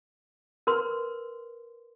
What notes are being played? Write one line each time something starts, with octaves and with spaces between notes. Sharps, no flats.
A#4 B4 C6